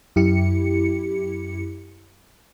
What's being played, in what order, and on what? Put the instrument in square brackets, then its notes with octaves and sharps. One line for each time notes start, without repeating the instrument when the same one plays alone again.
[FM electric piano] F#2 E4 G4 C#7